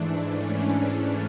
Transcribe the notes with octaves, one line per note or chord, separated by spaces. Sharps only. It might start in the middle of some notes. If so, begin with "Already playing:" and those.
Already playing: G#2 E3 A3 D4
C#4